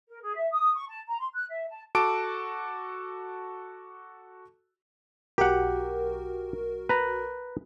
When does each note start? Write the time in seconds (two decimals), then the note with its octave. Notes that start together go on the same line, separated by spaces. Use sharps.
0.09 A#4
0.22 G#4
0.36 E5
0.52 D#6
0.75 C#6
0.88 A5
1.08 A#5
1.19 C6
1.34 F#6
1.49 E5
1.69 A5
1.95 F#4 A4 A5 D6 D7
5.38 B1 F#4 G4 A#4 F#5
6.89 B4 A#5